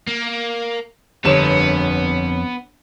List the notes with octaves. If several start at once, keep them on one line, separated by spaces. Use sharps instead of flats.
A#3
G1 F2 B3 C#5 E7